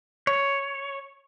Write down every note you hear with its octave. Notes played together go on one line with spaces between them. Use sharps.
C#5